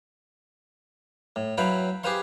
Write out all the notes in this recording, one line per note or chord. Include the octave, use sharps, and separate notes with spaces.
A2
F#3 E4 B4 F5 G5 B5
G4 G#4 B4 C5 F5 C6